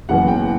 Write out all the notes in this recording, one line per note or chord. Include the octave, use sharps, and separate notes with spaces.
F#1 F#2 E3 B3 F#5
G5